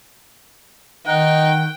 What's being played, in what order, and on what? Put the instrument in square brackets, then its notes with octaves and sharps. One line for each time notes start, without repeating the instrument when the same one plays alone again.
[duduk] D#3 [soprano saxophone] D#4 [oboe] F#5 [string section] G5